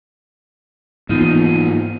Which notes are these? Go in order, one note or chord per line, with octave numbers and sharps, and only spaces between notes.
G#2 E3 A#3 B3 D#4 F4